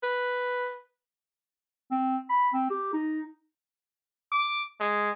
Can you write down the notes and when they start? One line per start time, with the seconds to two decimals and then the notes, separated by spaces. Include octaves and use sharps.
0.03 B4
1.91 C4
2.29 B5
2.54 C4
2.70 G4
2.93 D#4
4.32 D6
4.80 G#3